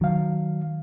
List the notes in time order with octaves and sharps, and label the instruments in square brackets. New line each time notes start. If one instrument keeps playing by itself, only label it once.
[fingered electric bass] D#3 [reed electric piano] F#3 F5